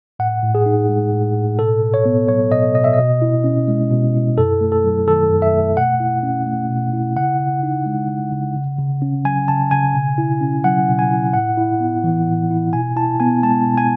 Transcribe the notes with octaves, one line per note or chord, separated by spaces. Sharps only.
A2 F#5
A2
G#4
D#4
G#3
A2
A2
B2 A4
B2
C#5
B3
F#3 C#5
B2 D#5
B2 D#5
E5
D#5
B2
E4
C#4
G#3
B2
E4
F#2 A4
A3
A4
F#3
D#3 A4
F#2
E5
A3
B2 F#5
E4
C#4
A3
B2
E4
C#3 F#5
C#3
D#4
G#3
C#3
C#3
C#3
C#3
C#4
F#3 G#5
C#3 A5
C#3 G#5
B2
E4
C#4
F#3 F#5
B2
G#5
E4
A2 F#5
E4
B3
E3
A2
E4
B2 G#5
E4 A5
B3 G#5
G#3 A5
B2
G#5